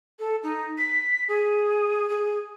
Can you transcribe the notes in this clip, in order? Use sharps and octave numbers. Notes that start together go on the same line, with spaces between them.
A4
D#4
B6
G#4
G#4